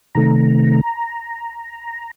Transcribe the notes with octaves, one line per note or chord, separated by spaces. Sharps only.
C3 D#3 A3 A#5